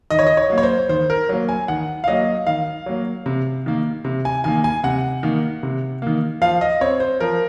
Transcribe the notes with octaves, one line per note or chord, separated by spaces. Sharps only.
D#3 D#5
C#5
D#5
C#5
F#3 A#3
C#5
C5
D#3 C5
A#4
F#3 A#3
G#5
D#3 F#5
F5
F#3 A#3 D#5
D#3 F5
F#3 A#3
C3
D#3 A#3
C3
G#5
D#3 A#3 G#5
G#5
C3 F#5
D#3 A#3
C3
D#3 A#3
F3 F5
D#5
C4 C#5
C5
F3 A#4